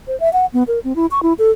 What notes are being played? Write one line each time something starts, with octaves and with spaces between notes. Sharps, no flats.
C5
E5
F#5
B3
A#4
C4
E4
C#6
E4
A4